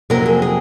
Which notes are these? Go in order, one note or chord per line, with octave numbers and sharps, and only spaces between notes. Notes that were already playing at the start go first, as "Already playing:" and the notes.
F2 C3 F#3 A#3 A#4
G#4
G#4